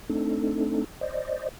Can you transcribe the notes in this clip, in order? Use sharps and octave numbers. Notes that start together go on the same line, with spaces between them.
A3 C4 D4 D#4 A4
C5 D5 D#5